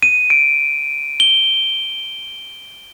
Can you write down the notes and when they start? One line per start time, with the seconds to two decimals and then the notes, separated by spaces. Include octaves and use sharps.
0.03 D#7
0.30 D7
1.20 G7